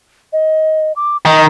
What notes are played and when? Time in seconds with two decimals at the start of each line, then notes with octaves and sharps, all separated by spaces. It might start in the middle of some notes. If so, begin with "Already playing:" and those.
0.33 D#5
0.96 D6
1.26 D#3 D#5